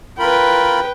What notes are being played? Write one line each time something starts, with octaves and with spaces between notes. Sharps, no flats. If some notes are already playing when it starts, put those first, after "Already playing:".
F4 A#4 B4 G5 B5